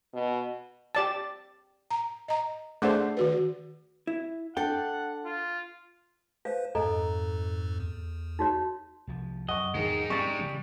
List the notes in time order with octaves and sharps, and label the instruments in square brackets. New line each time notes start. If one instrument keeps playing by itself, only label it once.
[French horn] B2
[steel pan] G4 D5 A5
[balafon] A#5
D#5 A#5
[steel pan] A3 D4 C5 [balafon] G#4 F#5
[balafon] D#3 F#4 B4
[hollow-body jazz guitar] E4
[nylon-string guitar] D4 A4 [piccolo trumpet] F#5 [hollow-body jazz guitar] G5
[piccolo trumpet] F4
[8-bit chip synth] B4 C5 [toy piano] F5
[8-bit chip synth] F2 G#2 [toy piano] A4 D#5 A#5
[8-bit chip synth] E2
[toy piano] D#4 F#4 C#5
[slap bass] C2 F3
[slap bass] F#2 [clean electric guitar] D#5 [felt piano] F#5 C#6
[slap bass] E2 G#2 [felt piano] D#3 G#4 [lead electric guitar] G#3 D#4
[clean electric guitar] G3 [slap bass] C4 C#4 [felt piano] C#6 A6
[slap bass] C#3 E3 C#4